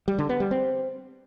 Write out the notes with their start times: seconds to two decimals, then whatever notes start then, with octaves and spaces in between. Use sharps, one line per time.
0.08 G3
0.19 D3
0.29 B3
0.40 G3
0.51 C4